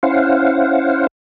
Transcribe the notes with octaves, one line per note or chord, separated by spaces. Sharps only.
C#4 E4 C5 F5 F#5